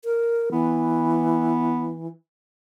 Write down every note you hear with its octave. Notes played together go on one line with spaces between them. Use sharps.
A#4
E3 B3